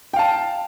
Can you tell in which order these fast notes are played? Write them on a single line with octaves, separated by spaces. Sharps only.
G5 F5 A5